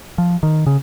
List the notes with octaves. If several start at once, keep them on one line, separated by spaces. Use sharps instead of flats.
F3
D#3
C#3